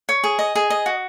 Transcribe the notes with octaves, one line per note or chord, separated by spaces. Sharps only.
C#5
G#4
D#5
G#4
D#5
F#4